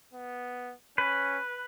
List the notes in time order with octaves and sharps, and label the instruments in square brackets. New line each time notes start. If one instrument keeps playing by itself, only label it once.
[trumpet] B3
[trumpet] C#4 [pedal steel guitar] B4